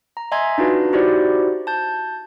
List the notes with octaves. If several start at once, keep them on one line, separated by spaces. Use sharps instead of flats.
A#5
D#5 E5 G#5 A#5 C6 G#6
D4 D#4 F4 F#4 B4
D#4 E4 F#4 G4 C5 D5
A5 G6